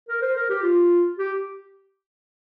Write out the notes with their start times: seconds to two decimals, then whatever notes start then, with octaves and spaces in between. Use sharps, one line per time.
0.09 A#4
0.22 C5
0.36 A#4
0.50 G4
0.63 F4
1.18 G4